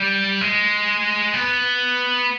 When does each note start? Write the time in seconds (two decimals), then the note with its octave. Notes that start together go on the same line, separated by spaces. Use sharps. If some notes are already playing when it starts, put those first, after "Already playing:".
Already playing: G3
0.41 G#3
1.34 B3